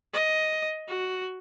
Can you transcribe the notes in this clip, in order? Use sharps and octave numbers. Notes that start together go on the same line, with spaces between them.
D#5
F#4